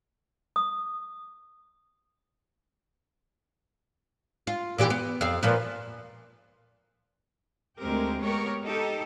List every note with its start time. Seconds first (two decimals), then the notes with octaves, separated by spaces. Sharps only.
0.56 D#6
4.47 F4
4.78 A#2 E3 G4
4.90 B3
5.21 F2 F5
5.43 A#2 F3 B4
7.78 D2 G#3 C4 G4 A#4
8.21 G#3 B3 G4 A#4 C#5
8.64 D#4 G4 A4